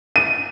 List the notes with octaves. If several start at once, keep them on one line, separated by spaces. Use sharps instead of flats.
D#7